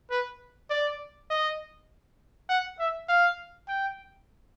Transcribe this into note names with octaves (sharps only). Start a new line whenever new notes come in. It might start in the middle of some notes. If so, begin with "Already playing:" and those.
B4
D5
D#5
F#5
E5
F5
G5